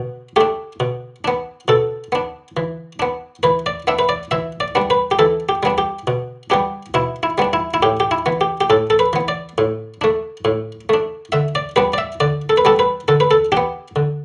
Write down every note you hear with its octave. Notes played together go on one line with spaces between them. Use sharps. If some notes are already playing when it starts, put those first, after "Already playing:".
Already playing: B2
A3 D4 G4
B2
B3 D4
B2 A4
B3 D4
E3
B3 D4
E3 B4
D5
B3 D4 E5
B4
D5
E3 E5
D5
G3 B3 D4
B4
G4
E3 A4
G4
G3 B3 D4
G4
B2
G3 B3 D4 G4
B2 E4
E4
G3 B3 D4
E4
E4
A2 G4
G4
E4
E3 B3
G4
G4
A2 A4
A4
B4
E3 B3
D5
A2
A3 D4
A2
A3 D4
D3 E5
D5
G3 B3 D4 B4
D5
E5
D3 D5
A4
B4
G3 B3 D4 A4
B4
D3 A4
B4
A4
B3 D4 G4
D3